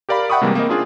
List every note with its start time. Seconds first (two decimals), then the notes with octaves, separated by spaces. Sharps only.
0.09 G4 A#4 D5 F5 B5
0.30 E5 F#5 G5 B5 C#6 D#6
0.42 C3 E3 G3 G#3 A#3
0.55 A#3 C4 A#4 D#5
0.69 C#4 D4 F4 G#4